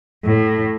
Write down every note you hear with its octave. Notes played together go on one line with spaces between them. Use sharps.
A2